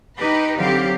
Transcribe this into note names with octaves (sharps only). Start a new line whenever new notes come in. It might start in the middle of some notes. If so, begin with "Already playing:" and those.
D#4 G4 B4
D3 F#3 C4 G4 F5